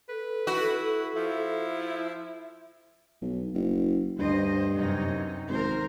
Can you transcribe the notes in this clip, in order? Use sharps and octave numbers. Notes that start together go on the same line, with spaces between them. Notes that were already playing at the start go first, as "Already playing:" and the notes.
A4 B4
E4 F#4
F3 E4
B1
F#1
D2 G2 C5 D#5
F#2 C3 D#4
G#1 A#4 C5